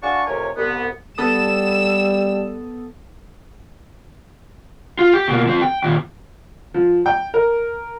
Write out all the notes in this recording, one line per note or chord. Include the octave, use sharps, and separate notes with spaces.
D4 F#4 F5 G#5 A5 C#6
F2 A2 C3 A#4 C#5 G#5
C2 B3
G3 B3 A4 D#6 E6 E7
F4
G4
B2 A#3
F3 C4
G5
D#2 A#2
F3
G5
A#4